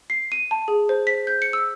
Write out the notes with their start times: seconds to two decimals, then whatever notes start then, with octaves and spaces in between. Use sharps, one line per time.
0.10 C7
0.32 D#7
0.51 A5
0.68 G#4
0.89 C5
1.07 B6
1.27 G6
1.42 C#7
1.53 E6